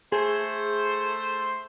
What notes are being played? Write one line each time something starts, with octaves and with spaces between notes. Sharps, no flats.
A3 G#4 C5